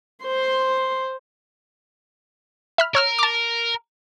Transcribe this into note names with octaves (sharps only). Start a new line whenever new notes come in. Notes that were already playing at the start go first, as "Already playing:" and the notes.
C5 C6
E5 B5 F6
A#4 C#5 E6 F6
A5 D6